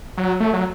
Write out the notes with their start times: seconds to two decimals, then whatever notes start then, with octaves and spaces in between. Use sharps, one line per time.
0.18 F#3
0.40 A3
0.53 F#3